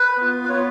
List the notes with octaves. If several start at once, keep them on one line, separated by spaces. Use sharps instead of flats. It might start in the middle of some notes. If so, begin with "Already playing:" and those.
Already playing: B4
B3 F4
B4
B3 F4 C#5